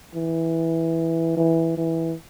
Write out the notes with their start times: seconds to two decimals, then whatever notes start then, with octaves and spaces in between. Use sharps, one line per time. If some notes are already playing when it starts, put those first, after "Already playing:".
0.15 E3
1.37 E3
1.77 E3